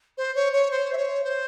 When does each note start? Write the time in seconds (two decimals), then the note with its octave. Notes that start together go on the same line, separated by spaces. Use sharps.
0.18 C5
0.35 C#5
0.53 C#5
0.71 C5
0.93 E5
0.97 C#5
1.24 C5